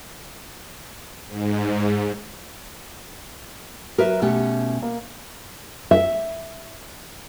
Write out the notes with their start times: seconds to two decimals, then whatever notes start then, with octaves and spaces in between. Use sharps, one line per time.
1.28 G#2
3.98 F#3 A#4 B4 E5
4.22 B2 A3 C#4 G4
4.82 A#3
5.91 E5